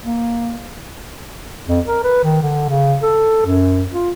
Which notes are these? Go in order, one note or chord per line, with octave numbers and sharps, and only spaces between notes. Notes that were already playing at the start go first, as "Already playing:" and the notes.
A#3
F2
A#4
B4
D#3
D3
C#3
A4
F#2
F4